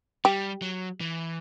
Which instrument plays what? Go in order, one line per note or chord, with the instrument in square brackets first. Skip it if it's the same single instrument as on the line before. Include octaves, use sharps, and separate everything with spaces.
[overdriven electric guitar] G3 [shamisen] G4
[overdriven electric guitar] F#3
E3